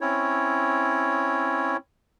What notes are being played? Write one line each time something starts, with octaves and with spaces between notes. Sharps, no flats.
C4 C#4 E4 C#5